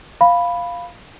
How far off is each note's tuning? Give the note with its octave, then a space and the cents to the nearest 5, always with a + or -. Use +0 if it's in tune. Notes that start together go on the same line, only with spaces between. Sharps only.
F5 +0 B5 +0